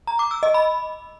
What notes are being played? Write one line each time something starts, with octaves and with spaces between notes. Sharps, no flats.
A#5
D6
E6
D#5
B5